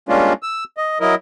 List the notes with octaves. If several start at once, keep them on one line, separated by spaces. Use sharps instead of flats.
G3 G#3 A#3 C#4 D4 F4
E6
D#5
F#3 E4 A#4 D#5